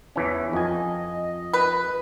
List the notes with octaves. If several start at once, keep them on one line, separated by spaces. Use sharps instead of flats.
E2 E3 C#4
F2 D#5 G#5
B4